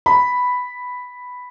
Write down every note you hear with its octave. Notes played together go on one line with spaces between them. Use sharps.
B5